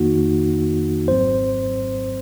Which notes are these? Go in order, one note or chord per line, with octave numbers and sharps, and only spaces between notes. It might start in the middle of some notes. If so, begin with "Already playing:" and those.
Already playing: F2 D#3 A#3 D#4 F#4
G#1 G#2 F#3 C4 C5